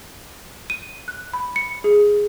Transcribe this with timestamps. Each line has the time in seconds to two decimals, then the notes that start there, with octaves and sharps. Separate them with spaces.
0.70 D#7
1.08 F#6
1.33 B5
1.56 C#7
1.84 G#4